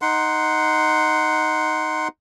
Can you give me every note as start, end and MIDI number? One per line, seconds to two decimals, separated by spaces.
0.02 2.08 63
0.02 2.08 78
0.02 2.08 84